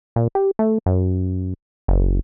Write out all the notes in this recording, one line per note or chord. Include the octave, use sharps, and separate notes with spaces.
A#2
G4
A3
F#2
F#1